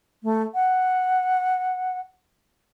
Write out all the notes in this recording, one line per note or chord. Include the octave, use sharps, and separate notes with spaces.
A3
F#5